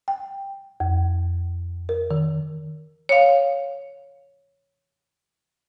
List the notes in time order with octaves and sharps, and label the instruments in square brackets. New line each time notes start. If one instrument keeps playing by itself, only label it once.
[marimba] G5
F2
A#4
D#3
C#5 F5